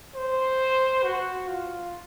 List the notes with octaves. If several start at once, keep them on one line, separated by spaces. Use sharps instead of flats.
C5
F#4
F4